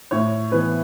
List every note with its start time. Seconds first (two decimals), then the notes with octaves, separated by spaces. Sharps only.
0.11 A2 C#5
0.52 E3 B3 B4